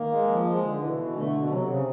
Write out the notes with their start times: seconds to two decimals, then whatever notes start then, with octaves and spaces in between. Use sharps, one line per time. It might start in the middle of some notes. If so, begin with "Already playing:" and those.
Already playing: D#3 A#3
0.10 G#3
0.28 F3
0.46 G#3
0.63 D3
0.81 B2 E3
0.98 B2
1.16 D3 A3
1.33 B2
1.50 C3 F#3
1.68 C#3